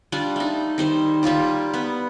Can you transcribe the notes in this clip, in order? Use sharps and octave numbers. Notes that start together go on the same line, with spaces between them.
G3 D4 F4
A3 D#4
D#3 G3 C5
G3 A#3 F4 G4
B3